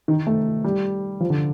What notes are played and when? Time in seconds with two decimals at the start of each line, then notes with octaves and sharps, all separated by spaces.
0.08 D#3
0.27 A3
0.64 G3
1.20 F3
1.30 D3